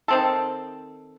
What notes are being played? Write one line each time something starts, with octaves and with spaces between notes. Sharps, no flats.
D#3 C4 A4